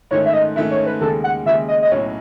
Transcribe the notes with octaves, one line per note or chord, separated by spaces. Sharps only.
G#2 D#3 A3 C#4 C#5
E5
D#5
G#2 D#3 A3 C#4 E5
C#5
B4
D#2 C#3 G#3 A4
F#5
D#2 C#3 G#3 E5
D#5
D#5
B1 A2 F#3 C#4 C#5